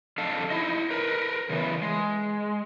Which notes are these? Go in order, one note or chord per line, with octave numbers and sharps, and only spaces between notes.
F2 D4 A4 D#5 F5
D#4 E4 D#5
A#4 B4
C#3 E3 B3
G#3